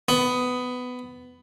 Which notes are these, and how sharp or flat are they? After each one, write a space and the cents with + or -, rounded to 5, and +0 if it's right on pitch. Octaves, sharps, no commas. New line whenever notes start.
B3 +15